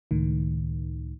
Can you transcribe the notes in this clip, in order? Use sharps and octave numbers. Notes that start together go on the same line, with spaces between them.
C#2 A2 D#3